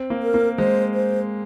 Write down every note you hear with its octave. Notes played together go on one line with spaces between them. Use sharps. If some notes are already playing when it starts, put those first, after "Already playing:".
Already playing: C4
A#3
A#4
A#3
G#3 C5
C5